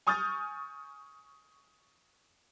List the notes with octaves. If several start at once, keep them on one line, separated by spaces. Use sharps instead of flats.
G#5 C#6 D#6 F6 G6 A6